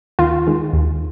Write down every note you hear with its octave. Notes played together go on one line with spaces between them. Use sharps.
D#2 F4
D#3 G#3
D#2